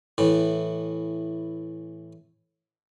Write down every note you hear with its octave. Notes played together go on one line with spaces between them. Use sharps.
A2 E3